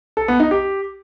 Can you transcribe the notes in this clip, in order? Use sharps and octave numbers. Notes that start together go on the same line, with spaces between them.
A4
B3
D#4
G4